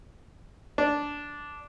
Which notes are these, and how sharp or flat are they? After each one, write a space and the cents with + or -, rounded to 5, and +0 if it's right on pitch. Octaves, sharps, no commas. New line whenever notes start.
D4 -10